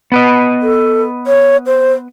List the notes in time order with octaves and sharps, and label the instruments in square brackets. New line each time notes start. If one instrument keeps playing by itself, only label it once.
[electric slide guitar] B3 B4 D#5
[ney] A4
C#5
C5